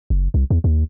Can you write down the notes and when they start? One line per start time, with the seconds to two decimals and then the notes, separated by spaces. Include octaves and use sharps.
0.10 F#1
0.34 C2
0.50 E2
0.64 D#2